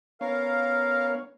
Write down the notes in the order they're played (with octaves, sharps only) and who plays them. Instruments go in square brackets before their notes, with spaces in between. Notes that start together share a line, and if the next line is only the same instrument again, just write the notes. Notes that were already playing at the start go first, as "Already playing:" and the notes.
[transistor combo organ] B3 C#4 C#5 [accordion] A#4 F5